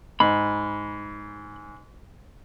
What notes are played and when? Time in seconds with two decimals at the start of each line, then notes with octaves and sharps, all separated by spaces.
0.20 G#2 B5